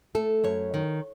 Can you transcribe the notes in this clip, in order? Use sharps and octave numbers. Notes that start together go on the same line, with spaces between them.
A3 A4
F#2 C#5
D#3